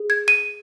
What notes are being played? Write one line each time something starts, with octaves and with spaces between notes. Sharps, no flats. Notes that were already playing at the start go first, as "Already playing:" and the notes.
Already playing: G#4
G#6
D#7